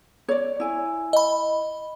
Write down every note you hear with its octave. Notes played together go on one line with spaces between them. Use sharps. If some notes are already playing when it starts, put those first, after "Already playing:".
C#5 D5
E4 G#5
D#5 B5